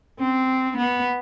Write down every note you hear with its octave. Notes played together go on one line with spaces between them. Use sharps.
C4
B3